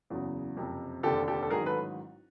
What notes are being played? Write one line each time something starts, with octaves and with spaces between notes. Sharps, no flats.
F#1 E2 C#3 F#3
F#1 F2 C3
F1 D#2 D3 G4 A4
G4 A4
A4
A1 G#2 D#3 F#3 G#4 A#4
A4 B4